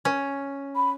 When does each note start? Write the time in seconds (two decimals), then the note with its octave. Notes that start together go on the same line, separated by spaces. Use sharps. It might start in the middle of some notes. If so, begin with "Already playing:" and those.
0.05 C#4
0.76 B5